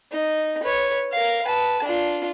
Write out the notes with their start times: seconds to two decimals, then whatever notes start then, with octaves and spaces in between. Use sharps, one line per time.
0.12 D#4
0.63 B4 C#5
1.12 A#4 F5
1.45 B4 A5
1.84 D4 F4